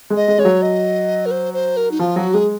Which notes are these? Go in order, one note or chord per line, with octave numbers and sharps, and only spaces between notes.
G#3
D#5
G#3
G#3 C#5
F#3
D#5
A#4
C5
C5
A#4
D#4
F3 F4
F#3 F#4
G#3 G#4